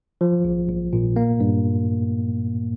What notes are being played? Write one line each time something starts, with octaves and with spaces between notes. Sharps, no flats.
F3
A#1
A#1
A#2
A#3
G2